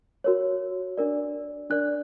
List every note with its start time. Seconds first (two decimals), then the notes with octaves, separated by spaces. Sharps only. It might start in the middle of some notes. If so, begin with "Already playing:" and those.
0.24 F#4 A#4 C#5
0.98 D4 A#4 D5
1.70 D4 A#4 D5 F#6